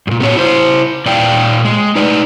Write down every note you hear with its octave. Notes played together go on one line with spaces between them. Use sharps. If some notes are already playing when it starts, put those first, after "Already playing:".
F#2 A#2
A3 B3 C#4 D4 F#4 C#5
E4 C5
A#2 D5 F5 G5
G#3
D#4 B4 D5